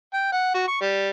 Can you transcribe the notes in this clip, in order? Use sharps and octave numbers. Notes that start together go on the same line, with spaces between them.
G5
F#5
F#4
C#6
G3